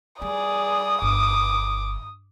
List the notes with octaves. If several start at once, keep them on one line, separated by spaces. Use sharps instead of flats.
G3 G#4 D5 D#6
G1 D6